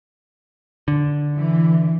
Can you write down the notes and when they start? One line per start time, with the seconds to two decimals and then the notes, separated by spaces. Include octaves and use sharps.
0.88 D3
1.35 E3